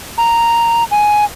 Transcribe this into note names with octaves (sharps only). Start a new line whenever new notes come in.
A#5
G#5